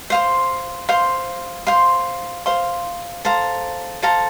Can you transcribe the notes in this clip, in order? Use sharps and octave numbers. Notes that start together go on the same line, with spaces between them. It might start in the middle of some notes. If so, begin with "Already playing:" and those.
C5 F5 C6
C5 F5 C6
C5 F5 C6
C5 F5 C6
A4 C5 F5 A#5
A4 C5 F5 A#5